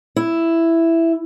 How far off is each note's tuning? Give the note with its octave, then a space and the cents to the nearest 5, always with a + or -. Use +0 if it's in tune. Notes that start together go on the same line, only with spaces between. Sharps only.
E4 +5